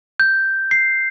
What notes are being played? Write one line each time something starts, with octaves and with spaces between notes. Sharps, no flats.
G6
C7